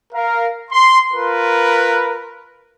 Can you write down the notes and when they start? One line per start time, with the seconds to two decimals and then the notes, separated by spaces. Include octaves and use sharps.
0.13 A#4 F5
0.71 C6
1.12 F4 A#4 B4